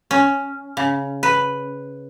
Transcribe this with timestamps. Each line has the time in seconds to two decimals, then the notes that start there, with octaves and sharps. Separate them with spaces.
0.11 C#4
0.77 C#3
1.23 B4